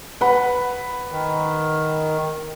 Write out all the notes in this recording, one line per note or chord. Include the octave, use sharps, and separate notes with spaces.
B4 F#5 B5
D#3